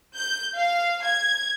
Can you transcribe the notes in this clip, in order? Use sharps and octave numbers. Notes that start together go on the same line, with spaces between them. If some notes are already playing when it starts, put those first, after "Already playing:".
G6
F5
G#6